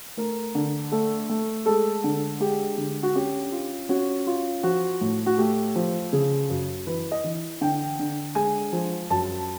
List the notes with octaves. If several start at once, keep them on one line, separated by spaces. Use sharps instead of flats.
A3 A#4
D3
A3 A4
A3
G#3 A4
D3
G#3 G4
D3
F#4
C#4 G4
F4
C#4 F#4
F4
F3 F#4
A2
F#4
A3 G4
F3
C#3 G#4
F#2
E3 B4
D#5
E3
D3 G5
D3
G#3 G#5
F3
F#2 A5